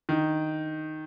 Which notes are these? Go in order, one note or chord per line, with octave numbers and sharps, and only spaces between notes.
D#3